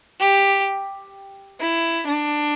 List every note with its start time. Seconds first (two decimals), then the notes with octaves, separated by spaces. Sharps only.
0.20 G4
1.60 E4
2.07 D4